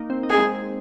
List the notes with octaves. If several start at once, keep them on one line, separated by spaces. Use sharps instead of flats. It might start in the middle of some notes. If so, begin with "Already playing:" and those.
Already playing: A#3 D#4
C4
D#4
G#4
G#3 C4